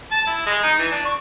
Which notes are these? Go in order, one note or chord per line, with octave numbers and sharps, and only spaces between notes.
A5
E4
G#3
D#4
E3
D4
C#6